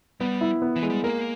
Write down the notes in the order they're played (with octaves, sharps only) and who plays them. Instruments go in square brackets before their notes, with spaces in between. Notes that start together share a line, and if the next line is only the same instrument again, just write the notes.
[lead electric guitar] G3 [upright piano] B3
[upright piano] E4
B3
[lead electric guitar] E3
[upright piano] G#3
[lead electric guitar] G3
[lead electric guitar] A#3 [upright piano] A#4